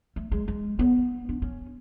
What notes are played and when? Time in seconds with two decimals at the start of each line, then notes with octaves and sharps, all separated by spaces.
0.16 A3
0.32 G#3
0.48 G#3
0.79 B3
1.29 D4
1.42 C#4